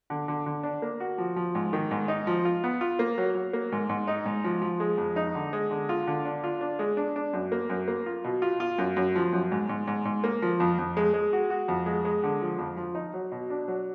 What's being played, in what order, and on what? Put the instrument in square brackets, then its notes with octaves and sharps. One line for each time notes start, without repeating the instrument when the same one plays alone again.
[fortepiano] D3
D3
D3
D4
A#3
F#4
F3
F3
G#2
D#3
G#2
D#4
F3
F4
B3
F4
A#3
F#3
F#3
A#3
G#2
G#2
D#4
G#2
F3
F3
G#3
F2
D#4
D3
G#3
D3
F4
D3
D4
F4
D4
G#3
D4
D4
F#2
A#3
F#2
A#3
F4
B2
F4
F4
F#2
F#2
F3
F#2
G#2
G#2
G#2
G#2
A#3
F3
F2
F2
G#3
G#3
F#4
F#4
F2
G#3
G#3
D3
F3
F2
F3
D#4
F#3
B2
D4
F#3